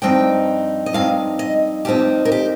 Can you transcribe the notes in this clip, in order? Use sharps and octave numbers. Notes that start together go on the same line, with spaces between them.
G2 F3 C4 D#4 G5
D#5
G2 F3 C4 D#4 F5
D#5
G2 F3 C4 D#4 G4
A#4
G4